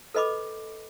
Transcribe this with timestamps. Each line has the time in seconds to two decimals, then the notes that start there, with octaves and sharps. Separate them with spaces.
0.14 A4 B4 D#5 B5 D6